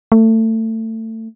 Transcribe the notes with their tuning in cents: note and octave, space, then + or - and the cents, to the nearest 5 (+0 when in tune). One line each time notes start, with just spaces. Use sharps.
A3 +25